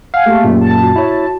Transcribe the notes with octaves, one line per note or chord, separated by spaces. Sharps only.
F5 F#5 G#5
A3 A#3 G4 G#4
F#2 A#2
A5
F#4
E4 C#5